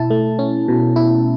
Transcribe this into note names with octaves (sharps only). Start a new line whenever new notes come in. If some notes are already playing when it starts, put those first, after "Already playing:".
Already playing: B2 E4 A5
A3
C#4
B2
E4